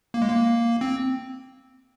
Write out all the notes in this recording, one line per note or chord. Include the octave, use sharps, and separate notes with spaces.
A#3
G#3
A#3
C4